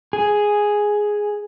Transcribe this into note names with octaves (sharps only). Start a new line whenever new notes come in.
G#4